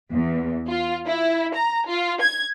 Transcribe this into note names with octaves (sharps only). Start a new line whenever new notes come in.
E2
F4
E4
A#5
F4
G#6